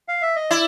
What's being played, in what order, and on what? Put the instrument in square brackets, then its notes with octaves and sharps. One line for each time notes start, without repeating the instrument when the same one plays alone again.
[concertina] F5
E5
D#5
[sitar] E4 [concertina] D5